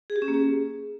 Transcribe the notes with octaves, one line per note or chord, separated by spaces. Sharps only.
G#4
G4
C#4
A#3
G#4